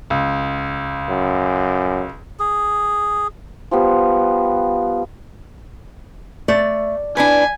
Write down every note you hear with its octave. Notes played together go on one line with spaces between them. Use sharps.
C#2
F#2
G#4
F3 G3 B3
A3 D5
D4 E4 B4 G#5